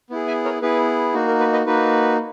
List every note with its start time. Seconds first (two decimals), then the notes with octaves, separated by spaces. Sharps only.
0.10 B3 E4 G#4
0.27 E5 G#5
0.44 A#4 C#5
0.62 B3 E4 G#4 B4
1.14 A#3 D#4 F#4
1.28 A#4
1.40 B4
1.53 B4 D#5
1.66 A#3 D#4 F#4 B4